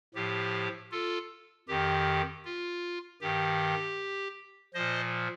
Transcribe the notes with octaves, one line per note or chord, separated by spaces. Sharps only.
A2 F3 G4
F4 A4
F2 D#3 G4
F4
G2 D#3 G4
A#2 F3 C5 D#5